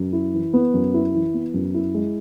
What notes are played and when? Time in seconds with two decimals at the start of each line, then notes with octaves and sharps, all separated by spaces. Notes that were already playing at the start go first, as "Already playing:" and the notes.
Already playing: F#2
0.13 E4
0.34 E3
0.53 B3
0.74 F#2
0.94 E4
1.14 E3
1.34 B3
1.54 F#2
1.74 E4
1.94 G#3